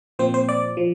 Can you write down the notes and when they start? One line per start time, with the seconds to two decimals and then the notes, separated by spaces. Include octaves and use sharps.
0.19 A#2 F3 C4 C5
0.34 C5
0.49 D5
0.77 F3